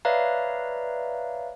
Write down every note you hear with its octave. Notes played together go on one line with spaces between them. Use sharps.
B4 C#5 D5 E5 F5 A#5